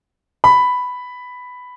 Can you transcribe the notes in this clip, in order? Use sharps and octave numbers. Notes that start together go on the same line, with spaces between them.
B5